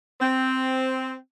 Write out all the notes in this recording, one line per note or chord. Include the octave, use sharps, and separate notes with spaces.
C4